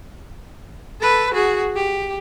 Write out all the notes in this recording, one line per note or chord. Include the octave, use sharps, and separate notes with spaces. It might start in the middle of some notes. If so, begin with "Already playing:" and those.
A4 B4
F#4 G#4
G4